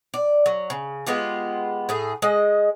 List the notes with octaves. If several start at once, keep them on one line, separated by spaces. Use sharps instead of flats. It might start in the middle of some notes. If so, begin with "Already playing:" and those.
D5
F#3
C#3
G#3 B3 F4 G4
A2 G#4
G#3 D#5